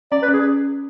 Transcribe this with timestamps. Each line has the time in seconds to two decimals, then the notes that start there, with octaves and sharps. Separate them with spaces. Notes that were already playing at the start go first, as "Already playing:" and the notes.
0.12 C#4 D5
0.23 B4
0.28 C#4
0.34 G#4